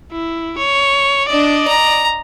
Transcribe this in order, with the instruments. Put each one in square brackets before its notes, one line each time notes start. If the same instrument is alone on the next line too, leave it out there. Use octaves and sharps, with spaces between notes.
[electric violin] E4
C#5
[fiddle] D4 [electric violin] D5 D#5
[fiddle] A#5